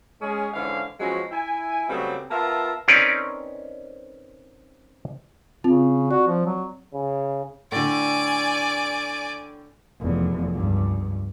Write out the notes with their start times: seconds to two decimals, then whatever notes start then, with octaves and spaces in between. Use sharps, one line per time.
0.22 G#3 C#4 G#4
0.54 G#2 D3 E3 C#4 F5
1.00 F3 F#3 G#3 B3 C#4 F#4
1.32 E4 G#5
1.89 C#3 F#3 G3 A3 B3 C4
2.30 B3 F4 A#4 E5 A5
2.88 C4 C#4 D#4 A#4 B4 D5
5.64 C#3 C4 F4
6.11 F#4 D5
6.28 F3
6.46 F#3
6.94 C#3
7.72 A2 D3 D5 G#5
10.00 F1 E2
10.52 C#2 G2